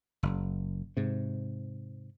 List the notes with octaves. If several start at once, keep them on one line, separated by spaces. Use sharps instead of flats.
F#1
G#2 C3